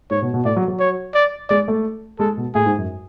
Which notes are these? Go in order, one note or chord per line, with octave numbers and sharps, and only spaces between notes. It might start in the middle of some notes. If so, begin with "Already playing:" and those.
G#2 C#5
B2
B2
A2 D5
F#3
F#3
C#5
D5
G#3 D5
A3
G#3 A4
B2
A2 G#4
G#2
F#2